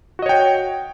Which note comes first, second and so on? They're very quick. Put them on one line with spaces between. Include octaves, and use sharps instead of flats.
F#4 D#5 C#5 G5